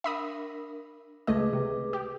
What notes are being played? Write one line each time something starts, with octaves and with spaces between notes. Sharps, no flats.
D4 A#4 E5 B5 D#6
C#2 A3 G#4 B4 D#5 D6
C3
G4